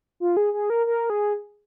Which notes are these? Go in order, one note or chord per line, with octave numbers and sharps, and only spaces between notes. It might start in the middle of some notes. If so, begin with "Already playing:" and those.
F4
G#4
G#4
A#4
A#4
G#4